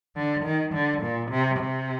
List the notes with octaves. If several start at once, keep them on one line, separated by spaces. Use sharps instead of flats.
D3
D#3
D3
A#2
C3
C3